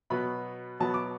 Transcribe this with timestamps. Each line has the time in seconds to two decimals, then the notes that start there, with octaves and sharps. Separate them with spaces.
0.10 B2 F#3 B3 B5
0.80 B2 F#3 B3 A5
0.94 D6